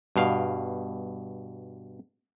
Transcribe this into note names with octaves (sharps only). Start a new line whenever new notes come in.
G2 B2 F5